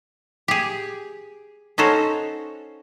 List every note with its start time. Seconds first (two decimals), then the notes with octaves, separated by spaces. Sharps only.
0.48 G4 G#4
1.78 C#4 D#4 F#4 A4 C5 C#5